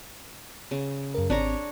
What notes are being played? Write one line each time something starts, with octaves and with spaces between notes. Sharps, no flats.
C#3
F#2 A#4
G#1 C4 D4 C#5 A#5